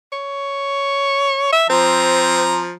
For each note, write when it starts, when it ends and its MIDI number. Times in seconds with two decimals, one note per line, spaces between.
0.13 1.52 73
1.53 1.67 76
1.70 2.72 53
1.70 2.67 60
1.70 2.72 82